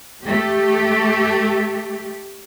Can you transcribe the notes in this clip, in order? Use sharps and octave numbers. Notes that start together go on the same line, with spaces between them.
A3 G4